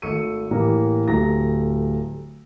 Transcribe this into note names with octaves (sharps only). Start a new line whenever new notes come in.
G#1 A3 C#6 E6 C#7 D#7
A2 E3 G3 A#3 A#5
D1 G3 A3 A#5 A#6